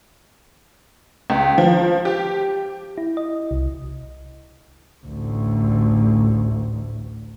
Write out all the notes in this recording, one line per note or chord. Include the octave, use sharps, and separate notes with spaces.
C#2
F3
G4
E4
D#5
C2
A1 D2